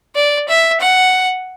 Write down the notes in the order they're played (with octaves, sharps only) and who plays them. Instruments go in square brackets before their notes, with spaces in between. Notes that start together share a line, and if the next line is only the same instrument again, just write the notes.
[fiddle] D5
E5
F#5